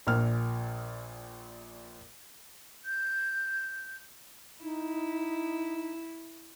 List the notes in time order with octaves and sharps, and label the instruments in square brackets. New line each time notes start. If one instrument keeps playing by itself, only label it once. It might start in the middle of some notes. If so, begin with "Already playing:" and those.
[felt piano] A#1 A#2 F6
[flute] G6
[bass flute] D#4 [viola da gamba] E4